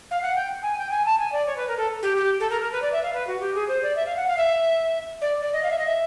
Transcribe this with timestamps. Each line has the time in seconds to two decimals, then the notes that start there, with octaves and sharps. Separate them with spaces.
0.11 F5
0.22 F#5
0.35 G5
0.63 G#5
0.78 G5
0.90 G#5
1.05 A5
1.18 G#5
1.32 D5
1.46 C#5
1.56 B4
1.68 A#4
1.77 A4
2.02 G4
2.16 G4
2.40 A4
2.50 A#4
2.61 A#4
2.72 B4
2.82 D5
2.92 E5
3.03 F5
3.13 B4
3.27 F#4
3.40 G4
3.55 G#4
3.68 C5
3.82 D5
3.95 E5
4.06 F5
4.16 F#5
4.27 F5
4.38 E5
5.21 D5
5.42 D5
5.53 D#5
5.63 F5
5.71 E5
5.78 D#5
5.86 E5